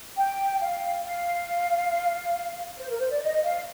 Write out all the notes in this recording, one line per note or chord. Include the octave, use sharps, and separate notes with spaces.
G5
F5
F5
C5
A#4
C5
D5
D#5
F5